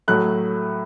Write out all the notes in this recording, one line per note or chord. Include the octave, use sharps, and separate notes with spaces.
A2 F#3 A3 F#6